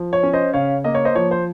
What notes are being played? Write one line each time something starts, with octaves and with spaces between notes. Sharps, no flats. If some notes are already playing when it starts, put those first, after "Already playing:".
Already playing: F3
C#5
C#4
C5 D#5
C#3 C#5 F5
A#3 D#5
C#5
C5 D#5
F3 C#5
C5